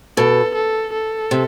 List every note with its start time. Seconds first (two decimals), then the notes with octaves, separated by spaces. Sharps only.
0.17 B2 A4
0.55 A4
0.93 A4
1.31 C3